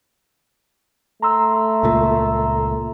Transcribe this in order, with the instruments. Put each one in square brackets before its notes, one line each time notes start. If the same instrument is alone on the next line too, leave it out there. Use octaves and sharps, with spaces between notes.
[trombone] A3 [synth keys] A#5 C6 E6
[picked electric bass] C#2 A#2